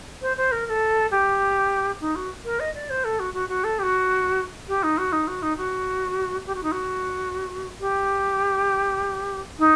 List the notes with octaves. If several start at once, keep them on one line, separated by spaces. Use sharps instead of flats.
C5
C5
A#4
A#4
A4
G4
D#4
F#4
A#4
D#5
D5
C5
A4
F#4
F#4
F#4
A4
G4
F#4
G4
D#4
F#4
D#4
F#4
D#4
F#4
G4
F#4
D#4
F#4
G4
D#4